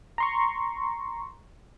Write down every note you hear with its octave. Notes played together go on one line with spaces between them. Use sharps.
A#5 C6 C#6